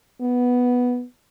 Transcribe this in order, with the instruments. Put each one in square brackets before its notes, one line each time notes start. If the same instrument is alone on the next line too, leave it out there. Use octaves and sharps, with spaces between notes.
[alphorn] B3